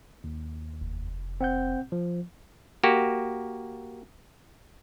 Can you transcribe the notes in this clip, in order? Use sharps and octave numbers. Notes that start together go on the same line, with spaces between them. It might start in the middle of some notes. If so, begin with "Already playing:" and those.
D#2
F1
C4 F#5 G6
F3
A#3 F#4 G4